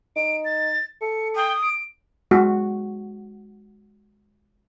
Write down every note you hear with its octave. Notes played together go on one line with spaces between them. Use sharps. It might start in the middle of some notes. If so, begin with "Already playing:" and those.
D#4 D7
A6
A4 C#7
G5 D#6
D7
G#3 F#4